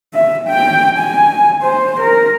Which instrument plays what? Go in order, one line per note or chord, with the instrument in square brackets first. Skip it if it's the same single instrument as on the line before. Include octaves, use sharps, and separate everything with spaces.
[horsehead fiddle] E5
G5
G#5
C5
A#4